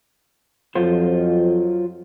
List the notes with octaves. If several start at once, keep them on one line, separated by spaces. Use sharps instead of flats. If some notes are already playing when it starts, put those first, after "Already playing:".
F2 F#3 F4 C5